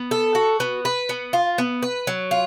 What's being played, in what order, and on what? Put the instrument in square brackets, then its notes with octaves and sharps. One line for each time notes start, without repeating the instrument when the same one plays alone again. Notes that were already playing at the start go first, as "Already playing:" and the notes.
Already playing: [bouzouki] B3
A4
F#4
B3
B4
B3
F4
B3
B4
F#3
F4